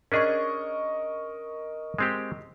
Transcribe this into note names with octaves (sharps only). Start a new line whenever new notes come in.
C#4 D4 G#4 A#4 D#5 C#6
G#3 C4 G4